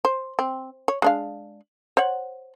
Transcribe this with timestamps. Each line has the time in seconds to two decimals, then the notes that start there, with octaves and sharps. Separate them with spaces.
0.05 C5
0.39 C4
0.88 C#5
1.02 G#3 D4 F5
1.97 C5 C#5 F#5